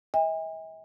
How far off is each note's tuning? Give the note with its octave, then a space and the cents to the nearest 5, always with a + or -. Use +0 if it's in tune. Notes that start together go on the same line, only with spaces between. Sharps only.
E5 -45 G#5 -45